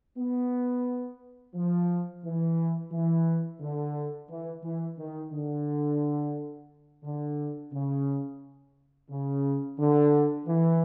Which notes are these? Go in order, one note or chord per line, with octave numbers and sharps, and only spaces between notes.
B3
F3
E3
E3
D3
E3
E3
D#3
D3
D3
C#3
C#3
D3
E3